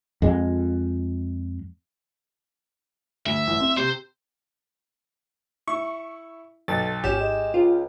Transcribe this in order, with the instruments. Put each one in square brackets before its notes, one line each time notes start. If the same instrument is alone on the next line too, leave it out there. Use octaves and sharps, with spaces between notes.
[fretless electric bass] F2 G#3
[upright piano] D2 [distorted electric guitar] E5
[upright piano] A1
C4
[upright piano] C3 [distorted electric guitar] C5
[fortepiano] E4 [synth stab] C#6
[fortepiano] B1 [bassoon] A4 [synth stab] A6
[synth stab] G#1 E7 [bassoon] C#4 [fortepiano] G4
[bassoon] G#3
[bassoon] C#2 [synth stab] F4